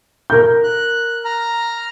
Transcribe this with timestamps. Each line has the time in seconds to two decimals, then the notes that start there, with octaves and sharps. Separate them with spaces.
0.30 A#4 G6
0.64 F#6
1.25 A#5 F6